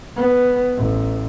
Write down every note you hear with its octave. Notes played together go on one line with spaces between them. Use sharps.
B3
A1